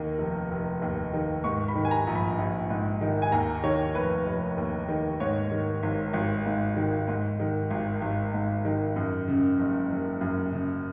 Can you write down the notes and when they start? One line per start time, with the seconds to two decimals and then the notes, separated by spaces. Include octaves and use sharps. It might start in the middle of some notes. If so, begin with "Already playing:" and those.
Already playing: D#2 D#3
0.19 F1
0.51 F1
0.82 D#2
1.13 D#3
1.44 G#2 C#6
1.68 B5
1.75 D#3
1.85 G#5
1.91 A#5
2.07 A#1
2.15 B5
2.38 A#1
2.70 G#2
3.01 D#3
3.22 G#5
3.32 D#2 A#5
3.64 D#3 C#5
3.95 F1 B4
4.26 F1
4.57 D#2
4.88 D#3
5.20 G#2 C#5
5.51 D#3
5.83 G#1
6.13 G#1
6.46 G#2
6.76 D#3
7.08 G#2
7.40 D#3
7.71 G#1
8.02 G#1
8.34 G#2
8.65 D#3
8.96 F#2
9.28 C#3
9.59 F#1
9.90 F#1
10.21 F#2
10.52 C#3